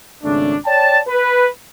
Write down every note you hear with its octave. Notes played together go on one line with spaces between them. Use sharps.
G#1 C#3 A3 D4
C#5 D5 G5 A5
B4